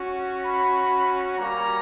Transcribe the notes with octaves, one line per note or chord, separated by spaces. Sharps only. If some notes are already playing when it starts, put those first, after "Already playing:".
Already playing: C#4 F#4
B5
G3 A#3 C#4 A#5